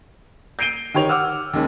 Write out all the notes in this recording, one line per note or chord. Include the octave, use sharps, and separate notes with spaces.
G6 C7 D7 D#7 G7
D#3 G4 C#5 F7
F#5 D6 E6 F6
D#2 D#3 G#3 C#4